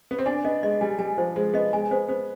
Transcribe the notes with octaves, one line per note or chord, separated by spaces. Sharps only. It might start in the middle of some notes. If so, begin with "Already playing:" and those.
B3
C4
D4 G#5
B3 D#5
G#3 D#5
G3 G#5
G3 G#5
F3 C5
G#3 C5
B3 D#5
G#3 G#5
B3 C5
B3 C5